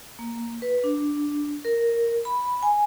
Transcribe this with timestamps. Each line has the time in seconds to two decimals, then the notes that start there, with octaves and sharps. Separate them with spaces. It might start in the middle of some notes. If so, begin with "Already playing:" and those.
0.19 A#3
0.62 B4
0.84 D4
1.65 A#4
2.25 B5
2.63 G#5